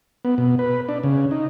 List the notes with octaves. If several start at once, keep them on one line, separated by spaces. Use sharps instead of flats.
B3
B2
B4
D4
C#3
D#4